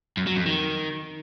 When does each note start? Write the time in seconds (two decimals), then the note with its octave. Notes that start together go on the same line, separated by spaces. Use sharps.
0.17 F#2
0.27 F#3
0.36 F2
0.46 D#3